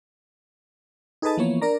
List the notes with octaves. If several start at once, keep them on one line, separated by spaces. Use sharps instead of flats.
D#4 G#4 A4 B4 D#5 A5
E3 F3 A#3 B3 C#5
D4 A#4 D5 A#5